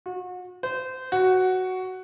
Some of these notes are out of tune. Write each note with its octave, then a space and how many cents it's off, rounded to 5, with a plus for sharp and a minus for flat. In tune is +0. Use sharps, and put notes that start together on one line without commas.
F#4 -35
C5 -25
F#4 +5